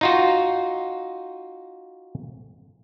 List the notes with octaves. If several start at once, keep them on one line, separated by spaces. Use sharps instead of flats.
D#4 F4 F#4